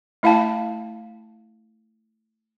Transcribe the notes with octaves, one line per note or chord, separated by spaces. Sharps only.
A3 E4 F5 G5 A5